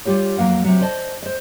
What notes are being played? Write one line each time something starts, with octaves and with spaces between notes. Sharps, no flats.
G3 F4 G4 C#5
F2 F#3 A#3 F5 F#5
C3 F#3
C5 D5 D#5 A5
C5 D#5